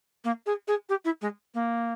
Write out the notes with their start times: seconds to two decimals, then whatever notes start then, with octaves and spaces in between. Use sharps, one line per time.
0.24 A#3
0.46 G#4
0.67 G#4
0.89 G4
1.05 E4
1.21 G#3
1.54 A#3